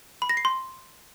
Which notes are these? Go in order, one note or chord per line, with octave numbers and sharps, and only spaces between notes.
B5
A#6
C7
C6